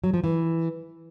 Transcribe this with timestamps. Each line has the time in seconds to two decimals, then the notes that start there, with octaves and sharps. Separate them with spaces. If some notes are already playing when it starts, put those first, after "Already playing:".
0.04 F#3
0.14 F3
0.24 E3